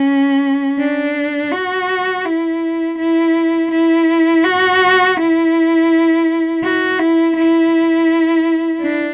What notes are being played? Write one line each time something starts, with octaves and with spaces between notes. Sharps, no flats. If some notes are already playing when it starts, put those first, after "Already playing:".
Already playing: C#4
D4
F#4
E4
E4
E4
F#4
E4
F#4
E4
E4
D4